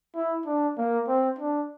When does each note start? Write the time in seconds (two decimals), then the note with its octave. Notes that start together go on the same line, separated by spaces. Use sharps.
0.15 E4
0.46 D4
0.77 A#3
1.07 C4
1.39 D4